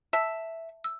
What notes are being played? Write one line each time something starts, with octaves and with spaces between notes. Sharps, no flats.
E5 A5 E6
E6